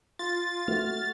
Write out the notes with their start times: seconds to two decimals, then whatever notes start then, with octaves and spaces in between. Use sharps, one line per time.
0.19 F4 A6
0.68 A3 F#4 F6